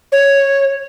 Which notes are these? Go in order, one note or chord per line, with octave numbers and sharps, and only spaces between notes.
C#5